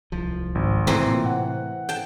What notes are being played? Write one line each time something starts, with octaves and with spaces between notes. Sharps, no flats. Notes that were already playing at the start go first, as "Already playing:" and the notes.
D1 C2 F3
G#1
A2 C3 E3 A3 C4 A#4
A#2
F#5
G5 A5